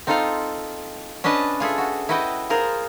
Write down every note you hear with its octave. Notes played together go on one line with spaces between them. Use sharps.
C4 D#4 F4 A4 D#5 F5
C#4 D4 B4 D#5 A5
F4 G#4 A4 E5
F#4
E4 F#4 B4 D#5 G5
F4 G#4 A#4 C5